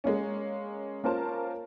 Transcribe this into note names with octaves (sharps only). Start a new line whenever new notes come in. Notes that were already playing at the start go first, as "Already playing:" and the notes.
G#3 A#3 C#4
A#3 C#4 F4 A#4 C5 A5